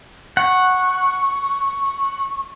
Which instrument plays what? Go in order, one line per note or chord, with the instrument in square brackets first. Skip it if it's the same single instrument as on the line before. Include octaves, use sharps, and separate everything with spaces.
[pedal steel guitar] F#5 [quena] C#6